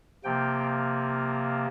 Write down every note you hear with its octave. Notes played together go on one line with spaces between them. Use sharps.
C3 F3 A#3 G5